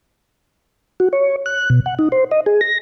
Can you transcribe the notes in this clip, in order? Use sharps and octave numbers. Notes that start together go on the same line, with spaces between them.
F#4
C#5
F#6
B2
F#5
D#4
C5
D#5
G#4
A#6